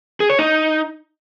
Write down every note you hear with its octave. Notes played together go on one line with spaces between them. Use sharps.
G#4
C#5
D#4